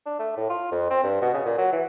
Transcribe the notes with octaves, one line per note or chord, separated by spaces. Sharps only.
D4
A3
A2
F4
F2
C4
G2
B2
C#3
A#2
F#3
E3